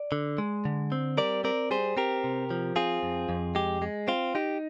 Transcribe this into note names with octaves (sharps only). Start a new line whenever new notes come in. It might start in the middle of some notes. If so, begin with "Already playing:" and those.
Already playing: D5
D3
G#3
D3
C4
G3 A#4 D5
C4 A#4 D5
G3 G#4 C5
C4 G4 A#4
C3
F3
C4 F4 G#4
F2
F2
G#3 G4
G#3
C4 F4
D#4 G4